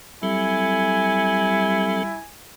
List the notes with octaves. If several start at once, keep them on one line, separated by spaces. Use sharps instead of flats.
F#3 G3 C4 E4 A4 G#5